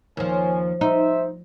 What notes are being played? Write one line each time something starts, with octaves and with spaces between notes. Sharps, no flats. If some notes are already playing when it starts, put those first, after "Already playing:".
D#2 F3 C5 C#5 G#5
D#4 C5 E5